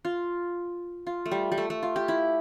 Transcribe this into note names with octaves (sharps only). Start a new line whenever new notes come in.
F4
F4
A3
G3
G3
A3
A3
F4
G4
E4